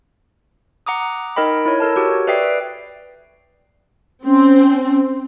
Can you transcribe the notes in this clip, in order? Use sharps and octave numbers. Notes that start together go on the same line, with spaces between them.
F#5 A#5 D6 D#6
D#4 A#4 D#5 G5 B5
E4 C#5
A4 A#4 A5
F#4 G4 C#5
B4 D5 E5 G5 D#6 C7
C4 C#4